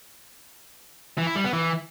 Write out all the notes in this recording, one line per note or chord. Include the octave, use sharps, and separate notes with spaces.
E3
E4
G3
B3
E3